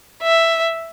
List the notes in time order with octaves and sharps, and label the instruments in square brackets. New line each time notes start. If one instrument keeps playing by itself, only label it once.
[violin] E5